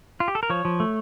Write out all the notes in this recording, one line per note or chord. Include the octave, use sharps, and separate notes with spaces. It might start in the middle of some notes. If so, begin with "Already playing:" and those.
F4
G4
A4
A#4
F3 C#5
F3
A3